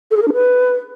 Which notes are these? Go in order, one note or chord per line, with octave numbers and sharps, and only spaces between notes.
A4
G#4
A#4
D4
B4